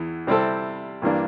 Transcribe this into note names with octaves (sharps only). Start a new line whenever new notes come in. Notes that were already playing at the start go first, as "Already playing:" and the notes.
Already playing: E2 E3
C3 G3 C4 E4 A4
G2 E3 A#3 D4